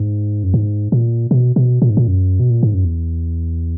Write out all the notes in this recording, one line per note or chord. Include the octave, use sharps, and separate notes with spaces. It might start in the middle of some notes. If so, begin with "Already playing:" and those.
Already playing: G#2
F#2
G#2
A#2
B2
B2
A#2
G#2
A#2
F#2
B2
A#2
G#2
F#2
E2